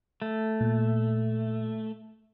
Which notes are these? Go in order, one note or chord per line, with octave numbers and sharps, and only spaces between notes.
A3
A#2